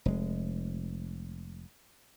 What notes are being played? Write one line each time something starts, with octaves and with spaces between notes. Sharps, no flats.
F1 G#3